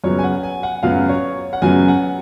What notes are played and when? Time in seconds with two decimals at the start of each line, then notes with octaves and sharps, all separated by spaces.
0.04 F#2 C#3 F#3 B3 C#5
0.19 G#5
0.24 F#5
0.43 G#5
0.63 F#5
0.83 F#2 C#3 F#3 B3 F5
1.09 C#5
1.53 F#5
1.62 F#2 C#3 F#3 B3 G#5
1.88 F#5